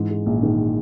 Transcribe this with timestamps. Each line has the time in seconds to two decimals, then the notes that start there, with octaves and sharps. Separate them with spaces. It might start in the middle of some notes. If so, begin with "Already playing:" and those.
Already playing: G#2 E3
0.10 G#3
0.26 A#1
0.42 D#3